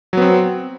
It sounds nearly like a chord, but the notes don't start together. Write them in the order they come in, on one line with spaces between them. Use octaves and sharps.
F#3 B3 C4